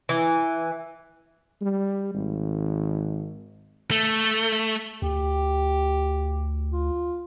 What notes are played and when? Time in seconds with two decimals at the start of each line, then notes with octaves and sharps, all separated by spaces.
0.09 E3
1.61 G3
2.14 G#1
3.91 A3
5.02 D2 G4
6.71 F4